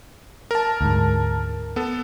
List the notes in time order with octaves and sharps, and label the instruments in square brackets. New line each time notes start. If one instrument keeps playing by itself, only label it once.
[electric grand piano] A#4 A5
[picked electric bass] D2 G#2
[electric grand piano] B3 A4